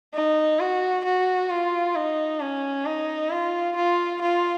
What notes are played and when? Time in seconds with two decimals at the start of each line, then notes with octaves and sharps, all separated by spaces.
0.14 D#4
0.59 F#4
1.04 F#4
1.50 F4
1.95 D#4
2.40 C#4
2.85 D#4
3.31 F4
3.76 F4
4.21 F4